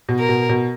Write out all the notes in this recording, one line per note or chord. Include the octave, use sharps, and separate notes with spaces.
B2
A#4
B2
B2